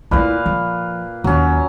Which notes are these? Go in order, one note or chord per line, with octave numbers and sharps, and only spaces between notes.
D2 A#2 E4 B4 F5
F3
D#2 F#3 C#4